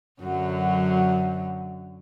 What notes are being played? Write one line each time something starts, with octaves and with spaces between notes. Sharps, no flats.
F#2 D3 F#3